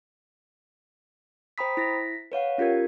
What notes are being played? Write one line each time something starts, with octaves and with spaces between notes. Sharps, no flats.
C5 G5 A#5 B5 D#6 B6
E4 A#6 B6
B4 C#5 F5 F#5
C#4 F4 G4 A#4 G#6